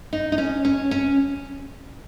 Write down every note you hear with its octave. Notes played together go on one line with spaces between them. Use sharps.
D#4
D#4
C#4
C#4
C#4